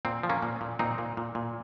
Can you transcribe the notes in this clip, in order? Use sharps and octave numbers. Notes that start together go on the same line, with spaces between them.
A#2 C4
F3
A#3 C#4
A#2
A#2
A#2 C4 D#4
A#2
A#2
A#2